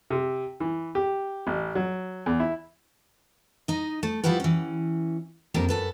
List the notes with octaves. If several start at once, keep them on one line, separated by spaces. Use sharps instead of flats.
C3
E3
G4
A1
F#3
E2
E4
D#4 D#5
A3
F3 G3 E4 F#4 G4 B4
E3 C#4
F2 A#3 D4 G4 A#4
F#2 A4 B4